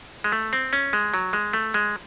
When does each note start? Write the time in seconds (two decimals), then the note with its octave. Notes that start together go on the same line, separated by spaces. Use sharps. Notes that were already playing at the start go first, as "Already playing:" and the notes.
0.24 G#3
0.32 A3
0.53 C4
0.73 C#4
0.93 G#3
1.14 F#3
1.33 G#3
1.53 A3
1.74 G#3